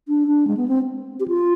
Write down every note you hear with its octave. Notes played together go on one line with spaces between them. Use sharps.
D4
D4
G#3
B3
C4
G4
F4